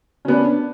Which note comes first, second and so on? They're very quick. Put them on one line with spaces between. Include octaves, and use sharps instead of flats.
C#4 B3 D4